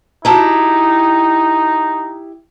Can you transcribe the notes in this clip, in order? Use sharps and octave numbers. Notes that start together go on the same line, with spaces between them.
D#4 E4 F#4 G4 A5 A#5